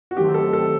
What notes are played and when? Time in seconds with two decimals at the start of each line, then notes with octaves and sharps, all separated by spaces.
0.11 F#4
0.17 D#3 F#3 A3 C4 G4
0.34 A4
0.53 A4